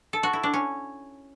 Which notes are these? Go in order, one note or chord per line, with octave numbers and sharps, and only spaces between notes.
A4
F#4
E4
D4
C#4